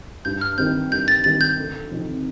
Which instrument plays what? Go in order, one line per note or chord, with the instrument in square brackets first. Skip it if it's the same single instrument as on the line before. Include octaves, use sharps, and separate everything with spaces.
[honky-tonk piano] G2 [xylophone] G6
[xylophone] F6
[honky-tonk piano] D#3 G3 C4 [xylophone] G6
[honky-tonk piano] G2 [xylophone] G6
[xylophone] A6
[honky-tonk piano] D#3 G3 C4 [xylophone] A6
[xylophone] G6
[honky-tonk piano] D2
C3 F3 C4 D#4